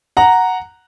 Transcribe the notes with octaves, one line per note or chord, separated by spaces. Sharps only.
F#5 A#5